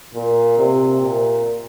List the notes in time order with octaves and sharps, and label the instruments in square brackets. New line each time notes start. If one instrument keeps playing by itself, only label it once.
[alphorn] A#2
C3
A#2